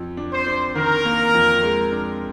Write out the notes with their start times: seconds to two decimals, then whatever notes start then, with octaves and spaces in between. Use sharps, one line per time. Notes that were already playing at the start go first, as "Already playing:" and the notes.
Already playing: F2
0.17 D4
0.32 C5
0.47 D4
0.76 D#3 A#4
1.05 A#3
1.34 F2
1.63 G#3
1.92 D4